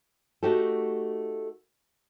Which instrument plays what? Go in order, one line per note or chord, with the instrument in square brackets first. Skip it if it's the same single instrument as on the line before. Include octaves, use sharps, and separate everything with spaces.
[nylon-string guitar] A3 D#4 F#4 G4 A4